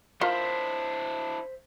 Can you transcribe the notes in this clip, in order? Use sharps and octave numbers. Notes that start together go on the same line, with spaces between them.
D4 E4 F4 A#4 C5 E5 F5 C6